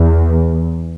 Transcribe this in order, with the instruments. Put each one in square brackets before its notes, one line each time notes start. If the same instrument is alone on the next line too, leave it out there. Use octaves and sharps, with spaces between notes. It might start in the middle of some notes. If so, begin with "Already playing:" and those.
Already playing: [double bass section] E2